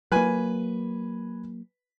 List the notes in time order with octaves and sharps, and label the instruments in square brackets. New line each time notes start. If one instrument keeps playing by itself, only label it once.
[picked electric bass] F#3 A#3 [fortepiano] B4 G#5